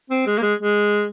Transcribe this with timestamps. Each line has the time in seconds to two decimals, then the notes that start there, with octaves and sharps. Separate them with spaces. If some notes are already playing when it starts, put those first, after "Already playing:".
0.10 C4
0.26 G#3
0.38 A#3
0.42 G#3
0.59 G#3